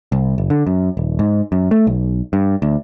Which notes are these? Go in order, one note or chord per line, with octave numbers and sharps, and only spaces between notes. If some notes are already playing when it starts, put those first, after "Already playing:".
C2
F#1
D3
F#2
D#1
G#2
F#2
A3
B1
G2
D2